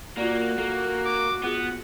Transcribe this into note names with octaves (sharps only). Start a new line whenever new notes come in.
A#3 F4 F#4 D5
A#3 A4
D6
B3 F4 G#4 F#5